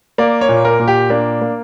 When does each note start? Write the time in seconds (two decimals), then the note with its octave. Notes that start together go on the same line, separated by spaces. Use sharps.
0.18 A#3 D5
0.41 C#5
0.49 A#2
0.65 A#4
0.80 A#2
0.88 G4
1.10 A#3 D4
1.42 A#3